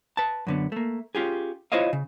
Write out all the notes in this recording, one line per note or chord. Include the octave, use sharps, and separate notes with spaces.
B4 A5
F#2 D3 B3
A3 A#3
C#4 F4 G4 G#4
E4 F4 C5 C#5 D#5 F5
C#3